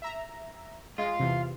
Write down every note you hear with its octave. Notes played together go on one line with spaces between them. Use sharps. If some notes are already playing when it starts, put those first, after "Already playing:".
E5 A#5
G#3 F4
E2 C3